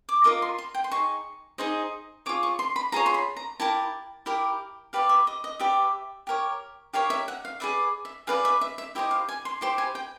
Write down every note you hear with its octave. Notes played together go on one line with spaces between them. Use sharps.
D6
F4 A#4 D#5 D6
C6
C6
G5
C6
D#4 G#4 C#6
D#4 G#4 C5 D#5
F4 G#4 C#5 D6
C#6
C6
B5
F4 G#4 C#5 A#5
C6
B5
A#5
E4 G4 A#4 A5
E4 G4 A#4
G4 B4 D5 F5
E5
D#5
D#5
G4 B4 D5 E5
G4 A#4 C#5
G4 A#4 C#5 F5
E5
F#5
F5
G#4 B4 D5 E5
E5
G#4 B4 D5 F5
E5
E5
E5
E4 G4 C5 D#5 E5
F5
G#5
C6
E4 G4 C5 C6
G#5
G5